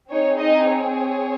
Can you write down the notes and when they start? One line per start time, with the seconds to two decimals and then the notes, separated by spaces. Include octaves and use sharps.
0.10 C4 D#4 G#4 C#5
0.39 D#4 D#5
0.67 C#5
0.96 C#5